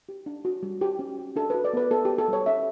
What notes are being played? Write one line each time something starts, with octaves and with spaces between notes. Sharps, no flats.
G4
D4
F#4
G3
F#4 G4
C#4
F#4
D4 A4
F#4 B4
D5
B3 B4
B3 A4
F#4 G4
A4
G3 C#5
C#4 E5